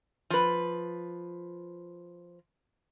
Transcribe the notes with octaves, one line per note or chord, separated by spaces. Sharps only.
F3 B4